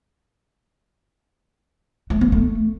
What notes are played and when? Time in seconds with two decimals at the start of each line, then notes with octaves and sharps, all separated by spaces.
2.10 A3
2.21 B3
2.32 A3